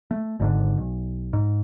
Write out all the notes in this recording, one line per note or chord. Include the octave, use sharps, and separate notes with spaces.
A3
G#1 G#2 D3
B1
G#2